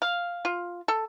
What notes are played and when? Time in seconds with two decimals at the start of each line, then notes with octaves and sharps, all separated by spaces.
0.02 F5
0.45 F4
0.88 A4